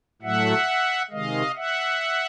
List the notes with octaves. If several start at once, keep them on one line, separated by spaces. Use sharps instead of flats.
A2 F#3 A3 E5 F#5
C3 D#3 G#3 D#5 F5
E5 F#5